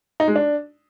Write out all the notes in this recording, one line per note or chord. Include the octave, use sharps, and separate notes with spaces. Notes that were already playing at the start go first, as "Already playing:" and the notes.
D#4
G#3
D4